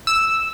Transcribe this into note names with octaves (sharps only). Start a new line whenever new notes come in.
E6